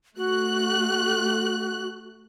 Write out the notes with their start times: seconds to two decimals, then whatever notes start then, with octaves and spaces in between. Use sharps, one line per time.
0.17 A3 F#4 F#6